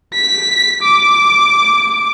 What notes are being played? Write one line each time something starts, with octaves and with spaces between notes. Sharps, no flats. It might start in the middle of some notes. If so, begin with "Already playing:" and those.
B6
D6